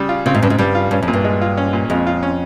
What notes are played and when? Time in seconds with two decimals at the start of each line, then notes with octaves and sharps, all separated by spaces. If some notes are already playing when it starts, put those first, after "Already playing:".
Already playing: C#3 G3
0.09 F4
0.26 C#3 C4
0.35 G#2
0.42 G2 C#3
0.50 G#2
0.58 G2 G3
0.75 F4
0.91 G2 C#4
1.02 F2
1.08 A#2
1.13 G2
1.24 G#3
1.41 F4
1.57 C#4
1.73 A#2
1.90 F2 G#3
2.07 F4
2.23 C#4